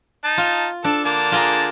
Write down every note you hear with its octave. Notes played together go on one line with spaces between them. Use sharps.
D#4 A5
F4
D4 A4
D3 A#3 A5
F4 G#4 A#4